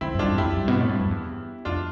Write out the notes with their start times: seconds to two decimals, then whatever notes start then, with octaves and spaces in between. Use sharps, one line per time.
0.01 D3 C4 E4
0.14 G2
0.19 D4 F4
0.28 E2
0.38 F2 E4 G4
0.56 G2
0.68 B2
0.79 A2
0.89 G2
1.00 F2
1.11 E2
1.65 F2 D4 F4